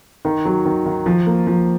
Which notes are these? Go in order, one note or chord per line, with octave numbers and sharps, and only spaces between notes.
D#3
F#3
D#3
D#3
F3
A#3
F3